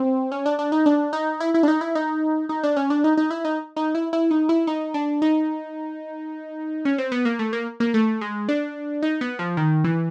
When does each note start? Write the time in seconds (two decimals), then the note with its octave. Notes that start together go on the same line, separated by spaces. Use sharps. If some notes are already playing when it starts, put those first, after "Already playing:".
Already playing: C4
0.32 C#4
0.46 D4
0.59 D4
0.72 D#4
0.86 D4
1.13 D#4
1.40 E4
1.54 E4
1.63 D4
1.68 D#4
1.81 E4
1.95 D#4
2.49 D#4
2.63 D4
2.77 C#4
2.90 D4
3.04 D#4
3.17 D#4
3.31 E4
3.45 D#4
3.76 D#4
3.95 E4
4.13 E4
4.31 D#4
4.49 E4
4.67 D#4
4.94 D4
5.22 D#4
6.85 C#4
6.98 C4
7.12 B3
7.25 A#3
7.39 A3
7.53 A#3
7.80 A#3
7.94 A3
8.21 G#3
8.49 D4
9.03 D#4
9.21 B3
9.39 F3
9.57 D#3
9.84 E3